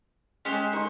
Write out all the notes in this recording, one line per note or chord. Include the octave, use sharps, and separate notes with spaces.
G#3 C#4 G4 C5
D#3 D#4 C5 C#6